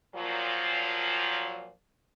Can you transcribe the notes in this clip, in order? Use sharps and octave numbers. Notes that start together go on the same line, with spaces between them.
A#2 F3 F#3